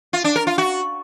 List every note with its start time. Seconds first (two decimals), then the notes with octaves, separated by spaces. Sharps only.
0.13 F4
0.24 D4
0.36 A#4
0.47 F4
0.58 F#4